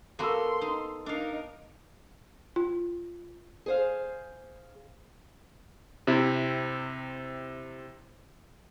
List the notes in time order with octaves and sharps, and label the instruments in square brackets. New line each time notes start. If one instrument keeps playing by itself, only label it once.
[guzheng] A#3 B3 F#4 [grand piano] A4 E6 [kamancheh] C6
[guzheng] D#4
[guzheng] D4 F5 [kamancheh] D#4 A#4
[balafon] F4
[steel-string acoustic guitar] G#4 C5 F5
[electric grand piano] C3 C4 E4